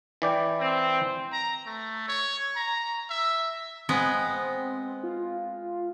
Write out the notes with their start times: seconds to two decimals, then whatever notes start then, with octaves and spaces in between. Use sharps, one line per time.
0.22 E3 D5 G5
0.60 C4
1.33 A#5
1.67 A3
2.08 C#5
2.56 A#5
3.10 E5
3.89 G#3 B3 C4
5.03 F4